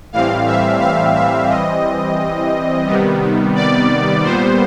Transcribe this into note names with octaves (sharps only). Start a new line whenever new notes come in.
A2 E3 G3 C4 F5
E5
F5
E5
E3 G3 C4 D#5
C3 D#3 G3 B3
D5
A#2 G3 B3 C5